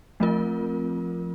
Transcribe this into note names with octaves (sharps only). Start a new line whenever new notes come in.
F3 A3 C4 F4 A#4